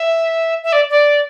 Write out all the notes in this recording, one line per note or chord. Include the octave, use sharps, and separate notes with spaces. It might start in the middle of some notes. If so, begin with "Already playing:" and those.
Already playing: E5
E5
D5
D5